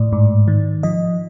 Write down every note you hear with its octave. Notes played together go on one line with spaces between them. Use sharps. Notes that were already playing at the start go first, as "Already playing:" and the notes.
Already playing: A2 D5
G#2
D#3
F3 D#5